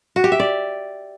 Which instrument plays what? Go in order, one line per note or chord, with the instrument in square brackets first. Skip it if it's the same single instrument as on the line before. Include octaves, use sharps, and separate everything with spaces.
[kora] F#4
G4
E5
D5